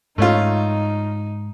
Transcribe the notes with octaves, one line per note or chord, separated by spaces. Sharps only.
G#2 A3 C#4 D#4 F4